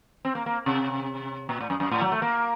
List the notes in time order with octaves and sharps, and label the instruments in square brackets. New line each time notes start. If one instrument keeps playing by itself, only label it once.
[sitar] C4
A#3
A#3
C3
A#2
A2
F#2
F#2
A2
F#3
A3
A#3